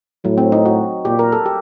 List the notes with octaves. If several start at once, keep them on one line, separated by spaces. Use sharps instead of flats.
A2 F#3
C4
D#4
F#4
A#2 G4
A#4
A4
G4